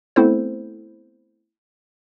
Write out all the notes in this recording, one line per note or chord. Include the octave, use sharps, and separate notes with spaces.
A3 B3 C4 E4 A4 C5